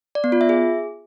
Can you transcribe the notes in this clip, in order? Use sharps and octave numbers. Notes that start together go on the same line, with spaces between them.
D5
B3
F4
E5
G#4